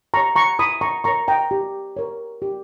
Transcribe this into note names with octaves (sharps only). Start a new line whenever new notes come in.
G4 C#5 A#5 C#6
A#5 C#6
E4 B5 D#6
A#5 C#6
A#4 C#5 A#5 C#6
G5 A#5
G4
A#4 C#5
G4